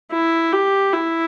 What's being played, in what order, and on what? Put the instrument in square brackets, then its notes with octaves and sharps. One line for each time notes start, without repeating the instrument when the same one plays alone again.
[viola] E4
G4
E4